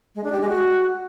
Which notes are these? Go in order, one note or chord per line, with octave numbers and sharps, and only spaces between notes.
G#3
D4
G4
G#3
F#4